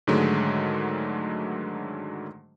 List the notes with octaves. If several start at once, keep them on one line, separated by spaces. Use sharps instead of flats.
G#2 D3 D#3 F#3 G#3 A3